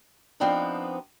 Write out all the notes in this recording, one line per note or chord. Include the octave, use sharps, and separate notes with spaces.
F3 B3 C4 D4 D#4 B4